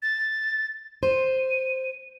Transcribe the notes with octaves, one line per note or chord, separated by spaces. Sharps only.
A6
C5 D#7